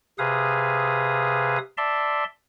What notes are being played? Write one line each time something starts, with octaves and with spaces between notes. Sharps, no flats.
C3 G#4 B4 F5 D#6
D5 E5 A5 C6